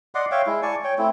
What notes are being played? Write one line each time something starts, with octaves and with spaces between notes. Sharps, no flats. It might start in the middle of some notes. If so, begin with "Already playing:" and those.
D5 D#5 F#5 C6
C#5 E5 F5 G5
G#3 E4
D5 G#5 A5 C#6
C#5 G5
A3 C4 E4